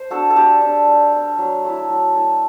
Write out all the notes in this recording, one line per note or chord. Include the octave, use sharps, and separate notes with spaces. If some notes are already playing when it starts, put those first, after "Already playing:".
Already playing: C5
D4 F#4 A4
A4
G3 G4
D4
G3
D4
F#3
A3 E4
F#3
A3 E4